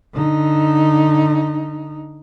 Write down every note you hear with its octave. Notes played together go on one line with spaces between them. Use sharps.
D3 D#4